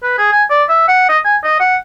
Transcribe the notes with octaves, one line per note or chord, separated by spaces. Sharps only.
B4
G#4
G#5
D5
E5
F#5
D#5
G#5
D#5
F#5